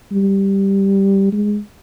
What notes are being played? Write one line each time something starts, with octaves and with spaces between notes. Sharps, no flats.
G3
G#3